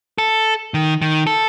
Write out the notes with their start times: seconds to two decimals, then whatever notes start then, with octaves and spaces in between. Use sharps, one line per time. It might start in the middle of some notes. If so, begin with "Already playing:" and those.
0.18 A4
0.74 D#3
1.02 D#3
1.27 A4